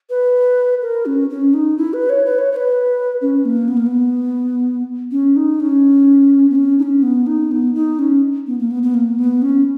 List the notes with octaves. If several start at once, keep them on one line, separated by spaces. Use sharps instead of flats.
B4
A#4
C#4
C#4
D#4
E4
B4
C#5
B4
C#5
C#5
B4
C#4
A#3
B3
A#3
B3
C#4
D#4
C#4
B3
C#4
D#4
C#4
B3
D#4
B3
D#4
C#4
B3
A#3
B3
B3
A#3
B3
C#4